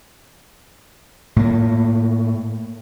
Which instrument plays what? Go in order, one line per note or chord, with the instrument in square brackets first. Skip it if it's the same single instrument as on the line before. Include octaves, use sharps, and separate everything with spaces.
[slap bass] A2 A#3